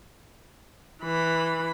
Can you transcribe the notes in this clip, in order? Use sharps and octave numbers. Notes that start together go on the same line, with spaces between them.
E3 B5